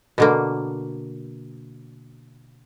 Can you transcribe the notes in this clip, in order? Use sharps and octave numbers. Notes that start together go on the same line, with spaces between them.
B2 D3 A#3